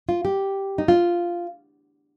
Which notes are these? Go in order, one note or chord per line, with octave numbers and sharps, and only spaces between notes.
F4
G4
D#4
F4